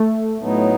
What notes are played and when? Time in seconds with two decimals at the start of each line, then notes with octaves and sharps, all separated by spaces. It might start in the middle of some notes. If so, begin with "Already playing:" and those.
Already playing: A3
0.39 A2 F#3 B3 D#4